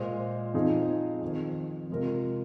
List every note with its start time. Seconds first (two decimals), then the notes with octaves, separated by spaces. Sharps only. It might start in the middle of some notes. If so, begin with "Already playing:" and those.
Already playing: A#2 G#3 F4 C5 D#5
0.54 F2 F3 C4 D#4 G#4
1.21 F2 D#3 C4
1.90 F2 C3 G#3 F4 A#4